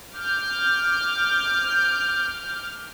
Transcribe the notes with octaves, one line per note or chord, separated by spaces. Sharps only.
D6 F6 G6